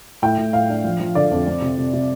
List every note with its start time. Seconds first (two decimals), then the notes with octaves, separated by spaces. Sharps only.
0.22 A2 G5
0.38 A2
0.53 A2 F5
0.69 D4
0.84 F3
1.00 F3
1.15 D3 D5
1.31 F2
1.47 C4
1.62 C3
1.78 C3
1.93 C3